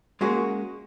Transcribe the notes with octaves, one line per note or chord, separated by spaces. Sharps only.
G#3 A#3 C#4 F#4 G#4